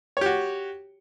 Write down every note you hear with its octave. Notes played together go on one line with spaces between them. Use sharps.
F#4 G4 C#5